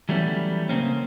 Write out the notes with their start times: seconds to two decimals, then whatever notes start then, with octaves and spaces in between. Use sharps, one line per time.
0.09 E3 F#3 G3 A3 B3 C#4
0.69 C#3 A#3 C4 C#4